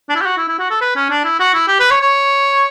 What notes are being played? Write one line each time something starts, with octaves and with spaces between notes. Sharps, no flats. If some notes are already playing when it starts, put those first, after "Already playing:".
D4
E4
G4
F#4
E4
E4
F#4
A4
B4
C#4
D4
E4
F#4
E4
G4
B4
C#5
C#5